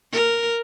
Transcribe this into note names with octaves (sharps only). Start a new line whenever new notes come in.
A#4